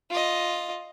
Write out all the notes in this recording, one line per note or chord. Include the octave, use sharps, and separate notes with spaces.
F4 D#5